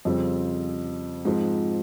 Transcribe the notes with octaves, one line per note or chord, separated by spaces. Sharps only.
F2 C#3 G3 C4 F4
G#2 F3 C4